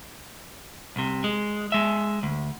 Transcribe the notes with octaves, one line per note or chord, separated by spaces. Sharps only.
C2 C3
G#3
G#3 E5
D2